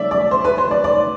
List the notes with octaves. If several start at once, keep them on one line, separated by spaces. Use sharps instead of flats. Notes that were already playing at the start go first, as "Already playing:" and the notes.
Already playing: D5 E5
D5
C5
B4
C5
D5
D5